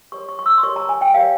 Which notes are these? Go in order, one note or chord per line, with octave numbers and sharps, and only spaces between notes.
G4 A#4 C#5 C#6
C#6
C#6
E6
C6
G4 A#4 C#5 C#6
A#5
G#5
G5
G4 A#4 C#5 F5